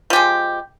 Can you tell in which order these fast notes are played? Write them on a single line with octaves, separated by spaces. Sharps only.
F3 G4 G#3